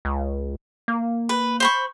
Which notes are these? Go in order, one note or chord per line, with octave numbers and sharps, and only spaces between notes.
C#2
A#3
B4
C5 B5 C#6